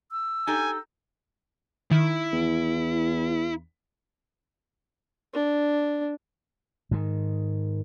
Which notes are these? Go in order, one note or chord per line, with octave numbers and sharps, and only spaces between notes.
E6
D#4 G4 A4 G#5
D#3 E4
E2
D4
G#2 D#3